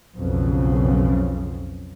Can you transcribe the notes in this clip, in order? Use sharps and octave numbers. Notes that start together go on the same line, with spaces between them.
B1 F2 C#3